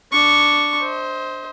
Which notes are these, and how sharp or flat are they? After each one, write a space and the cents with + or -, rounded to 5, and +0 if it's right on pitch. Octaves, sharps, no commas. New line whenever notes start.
D4 +0 C#6 +0
C5 +0 D#5 +40